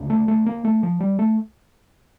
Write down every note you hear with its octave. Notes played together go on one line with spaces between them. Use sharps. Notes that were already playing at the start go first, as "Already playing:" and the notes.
Already playing: D2 C#3
A3
A3
A#3
A3
F3
G3
A3